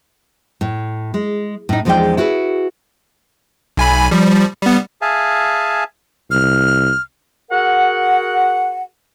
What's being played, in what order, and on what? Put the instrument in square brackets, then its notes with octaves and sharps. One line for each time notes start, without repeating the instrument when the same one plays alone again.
[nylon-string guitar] A2
G#3
A2 D#4
E2 F3 G#3 D#4 D5 G5
E4 F#4 G#4 B4
[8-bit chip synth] B1 G#5 B5
F3 G3
G3 B3
[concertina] G#4 E5 F5 G#5 A5
[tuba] C2 [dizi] F6
[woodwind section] F#4 G#4 A#4 F#5